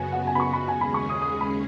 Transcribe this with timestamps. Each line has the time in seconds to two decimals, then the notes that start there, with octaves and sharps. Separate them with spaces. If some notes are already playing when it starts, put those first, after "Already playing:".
Already playing: F#2 C#3 B3 F#4 G#5
0.13 F#5
0.27 G#5
0.35 B5
0.40 C#6
0.53 B5
0.68 D#2 C#3 G#3 C#4 G#4 G#5
0.81 B5
0.94 C#6
1.09 D#6
1.22 D#6
1.41 B5